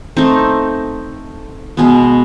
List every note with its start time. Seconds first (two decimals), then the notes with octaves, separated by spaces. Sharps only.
0.17 A3 C4 D#4
1.77 B2 G#3 B3